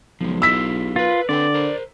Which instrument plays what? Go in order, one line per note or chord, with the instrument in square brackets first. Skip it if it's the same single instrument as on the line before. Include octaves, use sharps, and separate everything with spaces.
[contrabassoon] B1 [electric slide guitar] F3 G#3
[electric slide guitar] E4 F4 G4 [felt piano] E6 B6
[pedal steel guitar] F4 [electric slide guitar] A#4 B4
[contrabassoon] D3 [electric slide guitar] C4 B4 G5 [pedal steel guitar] D5
[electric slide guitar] A#4 C5